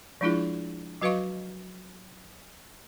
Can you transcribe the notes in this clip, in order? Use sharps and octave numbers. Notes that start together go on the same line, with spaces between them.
F3 G#3 D4 E4 F4 G#4
F#3 F#4 B4 D#5 F5 C#6